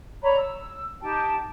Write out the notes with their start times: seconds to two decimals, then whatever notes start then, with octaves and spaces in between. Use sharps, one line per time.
0.22 C#5 D5 A#5 B5
0.38 E6
1.02 D#4 G4 G5 A5